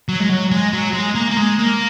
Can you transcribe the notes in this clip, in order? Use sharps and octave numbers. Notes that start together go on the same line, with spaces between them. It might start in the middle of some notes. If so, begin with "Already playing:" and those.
F#3
G#3
F#3
G#3
F#3
G#3
A#3
A#3
G#3
A#3